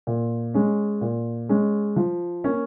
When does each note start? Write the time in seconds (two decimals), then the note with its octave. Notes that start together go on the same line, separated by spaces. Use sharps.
0.07 A#2
0.54 G#3 C#4
1.01 A#2
1.49 G#3 C#4
1.96 F3
2.44 A#3 C#4